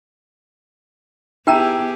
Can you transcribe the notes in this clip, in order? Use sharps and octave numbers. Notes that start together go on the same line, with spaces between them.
B3 E4 G4 G#4 G5 A5 A#5 E6